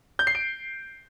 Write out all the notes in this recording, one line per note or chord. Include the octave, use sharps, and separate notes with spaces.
G6
C7
D7